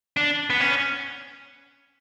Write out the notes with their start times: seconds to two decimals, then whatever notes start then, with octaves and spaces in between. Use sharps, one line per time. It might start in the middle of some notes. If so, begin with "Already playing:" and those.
0.17 D4
0.50 B3
0.60 C#4